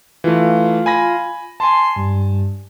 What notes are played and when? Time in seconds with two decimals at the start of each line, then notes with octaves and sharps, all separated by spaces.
0.24 E3 A3 F4
0.86 G#5 B5 A#6
1.60 G#5 A5 C6
1.96 G2